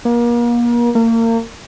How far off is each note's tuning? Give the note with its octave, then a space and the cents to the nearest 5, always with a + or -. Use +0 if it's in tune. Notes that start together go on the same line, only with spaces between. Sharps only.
A#3 +35
A#3 -35